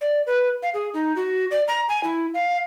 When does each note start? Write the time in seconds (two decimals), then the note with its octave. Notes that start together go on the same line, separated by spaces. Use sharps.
0.01 D5
0.26 B4
0.63 F5
0.74 G#4
0.94 D#4
1.16 F#4
1.51 D5
1.68 A#5
1.89 G#5
2.04 E4
2.34 F5